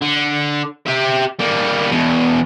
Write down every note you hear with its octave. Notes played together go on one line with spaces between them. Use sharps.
D3
G4 E5
G3 A#3
E2 B2